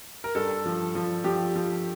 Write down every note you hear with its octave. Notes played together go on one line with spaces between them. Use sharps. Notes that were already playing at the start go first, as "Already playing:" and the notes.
A#4
G2 A4
F3
F3
F3 G4
F3